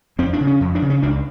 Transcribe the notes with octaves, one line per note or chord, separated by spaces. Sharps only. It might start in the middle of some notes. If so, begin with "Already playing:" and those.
F2 C4
D4
C#3
C#4
F2
D4
C#3
C#4
C#2 D4